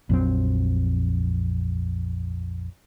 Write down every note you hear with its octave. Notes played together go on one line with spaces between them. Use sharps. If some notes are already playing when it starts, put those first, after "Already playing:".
A#1 F2 F#3 C4